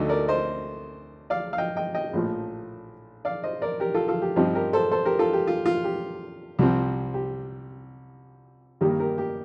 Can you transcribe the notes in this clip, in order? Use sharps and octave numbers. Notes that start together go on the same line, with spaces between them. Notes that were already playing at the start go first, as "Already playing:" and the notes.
Already playing: D2 D3 A3 D#4
A#4 D5
C5 D#5
D5 F5
F5
D#5 G5
D#5 G5
D#5 G5
A#1 A2 F3
D5 F5
C5 D#5
A#4 D5
G4 A#4
F4 A4
F4 A4
G4
G2 F3 C4 D#4 G4
G4 A#4
A4 C5
A4 C5
G4 A#4
F4 A4
G4
F4
F4
G4
C2 C3 F3 C4
G4
G2 D#3 G3 A#3 G4 A#4
G4 A#4
G4